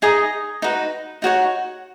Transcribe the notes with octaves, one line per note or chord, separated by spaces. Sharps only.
D#4 G#4 D#5 A#5
D#4 F#4 B4
D#4 F#4 C#5 F#5